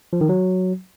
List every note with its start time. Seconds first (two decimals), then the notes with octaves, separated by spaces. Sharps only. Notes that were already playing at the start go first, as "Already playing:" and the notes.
0.13 F3
0.21 D#3
0.29 F#3